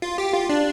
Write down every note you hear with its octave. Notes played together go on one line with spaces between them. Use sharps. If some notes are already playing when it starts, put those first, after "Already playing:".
F4
G4
F4
D4